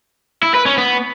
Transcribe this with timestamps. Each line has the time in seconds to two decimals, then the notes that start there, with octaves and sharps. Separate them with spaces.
0.43 E4
0.54 B4
0.66 C#4
0.78 B3